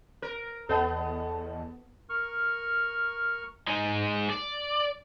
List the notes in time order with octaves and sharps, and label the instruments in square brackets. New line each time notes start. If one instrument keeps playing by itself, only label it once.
[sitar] A#4
[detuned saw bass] E2 [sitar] B3 [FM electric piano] A4 D#5 A5
[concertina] A#4 C#6 F6
[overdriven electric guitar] G#3 D#4
D5